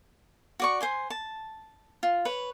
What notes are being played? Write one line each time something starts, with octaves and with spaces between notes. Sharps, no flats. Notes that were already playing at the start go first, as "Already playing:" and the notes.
F#4 D5 C#6
C5 G#5 C6
A5
F4
B4 C#5